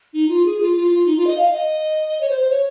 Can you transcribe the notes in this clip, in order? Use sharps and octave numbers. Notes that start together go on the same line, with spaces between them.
D#4
F4
G#4
F4
F4
F4
D#4
F4
D#5
F5
D#5
C#5
C5
C5
C#5